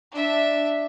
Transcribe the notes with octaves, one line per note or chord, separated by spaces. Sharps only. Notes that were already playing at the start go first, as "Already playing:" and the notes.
D4 E5